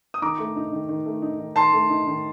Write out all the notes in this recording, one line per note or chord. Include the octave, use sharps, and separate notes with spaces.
D#6
D#3 A#5 D6
A3
D#4
D#3
D#3
A3
D#4
D#3
D#3 A5 C6
A3
D#4
D#3